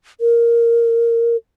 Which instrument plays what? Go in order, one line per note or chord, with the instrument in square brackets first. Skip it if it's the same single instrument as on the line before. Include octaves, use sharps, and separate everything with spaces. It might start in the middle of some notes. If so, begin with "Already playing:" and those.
[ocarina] A#4